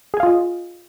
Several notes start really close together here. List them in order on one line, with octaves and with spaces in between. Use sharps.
G#4 G#5 F5 F4 D#5